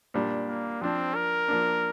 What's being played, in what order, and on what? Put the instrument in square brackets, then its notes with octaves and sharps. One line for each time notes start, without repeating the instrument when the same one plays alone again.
[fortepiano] A#2 G3 D4
[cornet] A#3
[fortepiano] F3 D4 [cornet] C4
[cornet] A#4
[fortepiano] F3 A#3 D4